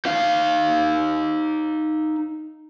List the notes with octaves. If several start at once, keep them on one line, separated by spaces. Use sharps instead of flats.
D#4 F5